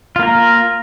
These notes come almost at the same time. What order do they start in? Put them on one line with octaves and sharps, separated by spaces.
F4 A#3 A#4